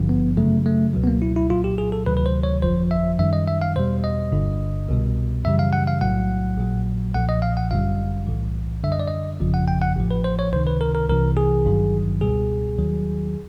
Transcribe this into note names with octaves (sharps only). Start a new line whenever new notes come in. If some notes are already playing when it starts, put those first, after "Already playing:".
Already playing: G#1 G2 D3 F3
B3
F#2 C#3 F#3 A3
A3
C#2 B2 F#3
B3
A#3
E4
E4
C2 A#2 F#3 F4
G4
G#4
A4
D2 C3 D#3 F#3 B4
B4
C5
C#5
G1 F2 D3 F3 C5
E5
F#2 D#3 G3 E5
D#5
E5
F5
E2 B2 G3 C5
D#5
G1 G2 D3
C2 B2 G3
F#2 C#3 E3 G3 E5
F5
F#5
F5
B1 A2 F#3 F#5
A#1 A#2 F#3
B1 A#2 F3 F#5
D#5
F5
F#5
G1 F#2 D3 G3 F5
B1 A2 E3
F#2 D3 G3 E5
D#5
D5
D#5
G1 F2 C#3 F3
F#5
G5
F#5
A1 A2 F3
B4
C5
C#5
C#2 C3 D#3 C5
B4
A#4
A#4
C2 C3 E3 A#4
G#4
G#1 G2 D#3 F#3
C#2 B2 G3 G#4
D#2 D#3 F#3